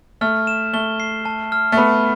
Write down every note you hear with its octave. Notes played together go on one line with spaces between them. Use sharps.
A3 F6
E7
A3 G7
C7
A5
F6
A3
B3 B5